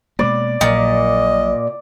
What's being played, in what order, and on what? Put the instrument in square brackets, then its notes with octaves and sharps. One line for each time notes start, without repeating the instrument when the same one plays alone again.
[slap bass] B2 G#3 A#3 [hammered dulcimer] D5
[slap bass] A#1 F#3 [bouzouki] A#2 [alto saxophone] D#5